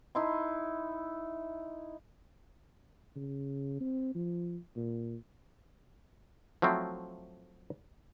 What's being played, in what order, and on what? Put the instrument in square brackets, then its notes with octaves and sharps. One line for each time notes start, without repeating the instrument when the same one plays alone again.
[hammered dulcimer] D#4 E4 C6
[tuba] C#3
C4
F3
A#2
[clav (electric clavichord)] F3 F#3 A3 C4 E4